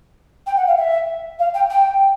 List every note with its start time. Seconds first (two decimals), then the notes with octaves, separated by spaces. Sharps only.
0.46 G5
0.56 F#5
0.66 F5
0.77 E5
1.38 F5
1.54 G5
1.69 G5